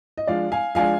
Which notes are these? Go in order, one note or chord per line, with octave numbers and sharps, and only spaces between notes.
D#5
F3 G#3 D4 D5 F5
F5 G#5
F3 G#3 D4 F5 G#5